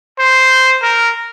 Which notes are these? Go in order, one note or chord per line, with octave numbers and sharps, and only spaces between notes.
C5
A#4